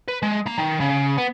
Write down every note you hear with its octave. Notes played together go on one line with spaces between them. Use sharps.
B4
G#3
A#3 A#5
D#3
C#3
B3